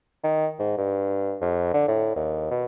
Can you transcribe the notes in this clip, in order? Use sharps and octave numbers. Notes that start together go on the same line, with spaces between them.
D#3
G#2
G2
F2
D3
A2
D#2
B2